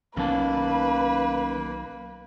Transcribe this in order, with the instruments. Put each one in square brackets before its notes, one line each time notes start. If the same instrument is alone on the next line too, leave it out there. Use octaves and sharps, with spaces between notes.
[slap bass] B1 [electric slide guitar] D#3 C#4 A5 [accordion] A#3 [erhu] B4